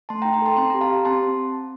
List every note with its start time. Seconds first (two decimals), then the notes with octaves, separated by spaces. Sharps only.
0.09 A3 A5 C6
0.22 D#4 G5 A#5
0.33 G5 A#5
0.42 A4 A5 C6
0.57 C4 A5 C6
0.70 G4 A#5
0.81 F5 A5
0.90 G4
1.05 C4 A5 C6
1.22 C4